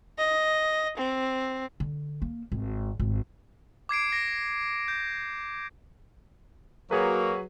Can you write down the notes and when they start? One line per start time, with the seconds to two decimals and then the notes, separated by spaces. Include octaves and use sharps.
0.18 D#5
0.97 C4
1.80 D3
2.22 A#3
2.52 G#1
3.00 G#1
3.89 D6 G#6 C7 D7
4.12 A#6
4.88 G6
6.91 F#3 A#3 F#4 G#4 B4